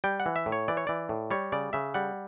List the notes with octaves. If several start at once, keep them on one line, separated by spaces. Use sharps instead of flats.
G3 G5
F#5
E3
E5
A2
C#5
E3 D5
C#5
E3 D5
A2
G3 C#5
C#3 D5
C#3 E5
G3 F#5